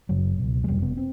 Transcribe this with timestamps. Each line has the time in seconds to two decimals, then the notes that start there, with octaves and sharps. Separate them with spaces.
0.09 F#1 F#2 C#3 F#3
0.39 C#2 B2
0.64 G#3
0.67 F#1 F2 C3 G3
0.82 B3
0.97 C4